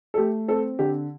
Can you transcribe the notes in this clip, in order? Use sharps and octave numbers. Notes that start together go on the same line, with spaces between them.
A4
A3 G4
C4 A4
D3 G4